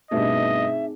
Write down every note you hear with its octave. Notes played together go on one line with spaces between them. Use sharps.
G2 B2 A3 C4 D#4 G#4 D#5 E5